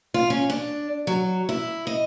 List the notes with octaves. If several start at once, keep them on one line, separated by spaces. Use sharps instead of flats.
F4
C#4
D4
F#3
E4
D#5